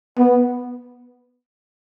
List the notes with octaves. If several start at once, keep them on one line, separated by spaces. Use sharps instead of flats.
B3